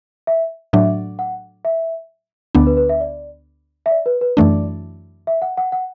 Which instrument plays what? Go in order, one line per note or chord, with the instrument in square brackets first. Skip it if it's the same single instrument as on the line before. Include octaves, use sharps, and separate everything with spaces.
[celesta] E5
[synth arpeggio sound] A2 F#3 D4 [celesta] E5
[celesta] F#5
E5
[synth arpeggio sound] D2 D3 B3 D4 [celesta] D5
[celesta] B4
B4
E5
D5
E5
D5
B4
B4
[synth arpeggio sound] F#2 E3 A3 D4 [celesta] D5
[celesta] E5
F#5
F#5
F#5